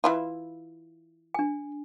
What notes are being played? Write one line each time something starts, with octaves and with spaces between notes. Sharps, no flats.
E3 E4 F4
D4 G#5